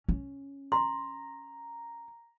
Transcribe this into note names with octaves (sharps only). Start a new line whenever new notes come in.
C#4
A#5 C6